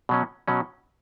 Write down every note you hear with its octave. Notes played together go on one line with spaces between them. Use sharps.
B2 F#3 C#4
B2 F#3 C#4